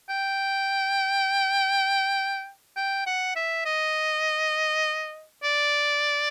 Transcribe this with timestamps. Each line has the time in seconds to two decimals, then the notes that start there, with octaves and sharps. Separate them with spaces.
0.09 G5
2.76 G5
3.06 F#5
3.35 E5
3.65 D#5
5.43 D5